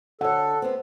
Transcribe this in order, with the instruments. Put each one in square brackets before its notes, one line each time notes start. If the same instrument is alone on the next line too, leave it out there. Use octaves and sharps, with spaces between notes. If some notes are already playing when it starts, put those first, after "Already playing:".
[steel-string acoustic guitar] D3 C#5 [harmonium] A4 [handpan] F#5
[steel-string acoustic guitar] B3 C4